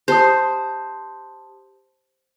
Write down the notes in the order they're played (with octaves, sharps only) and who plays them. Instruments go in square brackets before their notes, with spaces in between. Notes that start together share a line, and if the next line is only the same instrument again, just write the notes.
[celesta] G4 A5 D#6 [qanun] C5